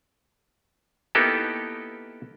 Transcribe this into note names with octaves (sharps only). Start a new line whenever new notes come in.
A#3 B3 D#4 E4 G4 A4